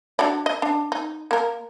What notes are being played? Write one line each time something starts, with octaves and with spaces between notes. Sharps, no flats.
D4 F#4 D5
D#5
D4
D#4
A#3 A#4